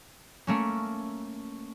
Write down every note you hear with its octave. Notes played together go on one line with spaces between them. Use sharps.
A3 A#3 C#4